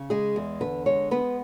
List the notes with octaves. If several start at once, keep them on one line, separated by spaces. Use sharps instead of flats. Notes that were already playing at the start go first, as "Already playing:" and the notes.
Already playing: C#3
G#3 G#4
E2
D3 B4
G#3 C#5
B3 B4